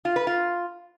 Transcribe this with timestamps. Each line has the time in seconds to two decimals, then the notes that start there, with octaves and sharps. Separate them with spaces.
0.05 F4
0.16 B4
0.27 F4